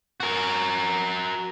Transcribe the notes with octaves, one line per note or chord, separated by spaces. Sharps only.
F#4 A#4